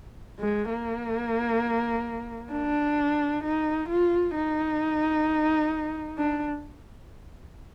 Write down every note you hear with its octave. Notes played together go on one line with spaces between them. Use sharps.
G#3
A#3
D4
D#4
F4
D#4
D4